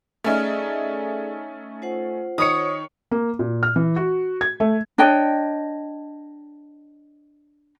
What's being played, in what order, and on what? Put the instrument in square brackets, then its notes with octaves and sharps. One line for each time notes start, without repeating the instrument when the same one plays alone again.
[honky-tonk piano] A3 C#4 D#4 [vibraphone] G#4 D5 E5 [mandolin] F6
[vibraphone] F4 C5 F#5
[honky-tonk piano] D#3 C#5 C#7 [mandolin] D#6
[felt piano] A#3
A#2
F6
E3
F#4
G#6
A3
[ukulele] D4 C#5 D#5 G5